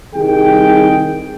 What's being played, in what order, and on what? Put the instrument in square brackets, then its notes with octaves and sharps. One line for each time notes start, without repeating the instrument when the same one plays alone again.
[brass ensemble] C2 D#3 G#4 G5